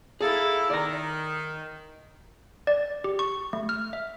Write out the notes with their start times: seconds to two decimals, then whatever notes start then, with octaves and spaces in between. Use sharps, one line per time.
0.21 A#3 E4 G#4 A4
0.70 D#3 D5 A#5
2.67 D5
3.04 G4
3.19 C#6
3.53 A3
3.69 F6
3.93 E5